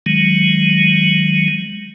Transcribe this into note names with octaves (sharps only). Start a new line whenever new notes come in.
D#3 F#3 G#3